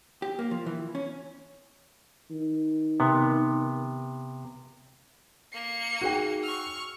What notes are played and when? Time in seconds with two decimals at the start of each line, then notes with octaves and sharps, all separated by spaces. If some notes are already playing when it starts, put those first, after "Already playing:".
0.22 G4
0.39 A#3
0.51 F3
0.66 E3
0.95 C#4
2.30 D#3
3.00 C3 B3
5.53 A#3 C#7
6.01 D#4 F#4 G#4 G5
6.43 C#6 E6 F6